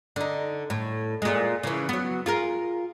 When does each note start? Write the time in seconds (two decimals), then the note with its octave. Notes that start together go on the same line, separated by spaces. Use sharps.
0.16 D3 D#4
0.70 A2
1.22 A#2 G#3
1.63 C#3 E3
1.89 F#3 B3
2.26 F4 G#4 A#4